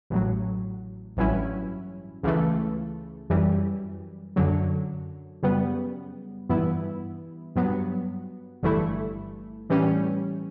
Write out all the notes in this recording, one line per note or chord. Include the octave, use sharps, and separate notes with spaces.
A1 A2 F#3
A1 G2 F#3 C#4 E4
C#2 C#3 E3 A3
F#2 E3 G3
F#2 D3 F#3
F#2 C#3 G3 B3
G2 E3 B3 E4
G2 F#3 B3
G1 G2 E3 A3 E4
A2 E3 G3 C#4